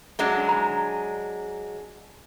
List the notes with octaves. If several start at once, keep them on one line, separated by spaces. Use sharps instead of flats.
F#3 G#3 D4
A#5